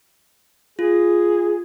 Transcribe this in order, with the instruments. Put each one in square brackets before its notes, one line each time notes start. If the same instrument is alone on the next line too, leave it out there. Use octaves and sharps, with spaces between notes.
[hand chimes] F4 [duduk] G#4